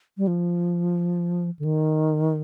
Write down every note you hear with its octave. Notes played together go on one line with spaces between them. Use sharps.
G3
F3
D3
D#3